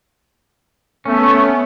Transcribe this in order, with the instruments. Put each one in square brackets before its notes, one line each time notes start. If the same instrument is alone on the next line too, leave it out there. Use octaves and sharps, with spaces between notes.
[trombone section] A3 [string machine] B3 [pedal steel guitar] C#4